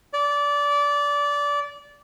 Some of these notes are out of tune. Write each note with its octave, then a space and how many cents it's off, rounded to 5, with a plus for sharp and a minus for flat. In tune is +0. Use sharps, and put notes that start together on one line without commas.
D5 -20